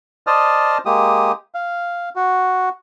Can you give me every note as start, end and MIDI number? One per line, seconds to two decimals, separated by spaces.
0.27 0.78 72
0.27 0.78 74
0.27 0.78 75
0.27 0.78 81
0.27 0.78 87
0.27 0.78 89
0.85 1.32 56
0.85 1.32 58
0.85 1.32 67
0.85 1.32 87
1.54 2.09 77
2.16 2.69 66